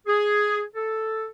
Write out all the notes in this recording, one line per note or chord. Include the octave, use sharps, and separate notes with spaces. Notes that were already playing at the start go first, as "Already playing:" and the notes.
G#4
A4